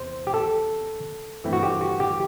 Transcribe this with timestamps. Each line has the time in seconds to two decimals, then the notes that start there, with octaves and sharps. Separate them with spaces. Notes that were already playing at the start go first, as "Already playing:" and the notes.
Already playing: E2 C3 C5
0.27 G4
0.34 A4
1.44 G2 E3 A3 C4 E4
1.53 F#4
1.63 G4
1.81 F#4
2.00 G4